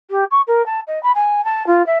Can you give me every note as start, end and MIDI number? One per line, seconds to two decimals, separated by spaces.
0.11 0.24 67
0.31 0.41 85
0.47 0.65 70
0.66 0.80 81
0.87 1.02 75
1.03 1.12 83
1.15 1.44 80
1.45 1.66 81
1.67 1.85 65
1.86 1.98 76